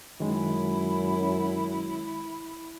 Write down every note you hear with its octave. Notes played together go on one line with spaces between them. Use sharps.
F#2 D#3 G#3 E4